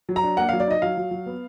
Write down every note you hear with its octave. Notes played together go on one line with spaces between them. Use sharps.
F#3
A#5
D4
A#3 F#5
F#3 F5
D5
D#4 D#5
F#3 F5
F#3
F#3
B3